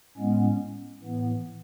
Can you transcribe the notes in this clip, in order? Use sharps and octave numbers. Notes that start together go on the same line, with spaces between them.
A2 G#3 B3 C#4
A2 E3 B3